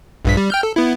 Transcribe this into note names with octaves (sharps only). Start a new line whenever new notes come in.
A#1 G2 B6
G3
G5 F6 G6
A4
B3 E4